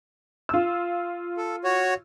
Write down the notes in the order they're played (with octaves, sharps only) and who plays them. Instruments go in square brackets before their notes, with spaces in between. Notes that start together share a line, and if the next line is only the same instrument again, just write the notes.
[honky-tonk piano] F4 E6
[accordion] A4
F#4 C#5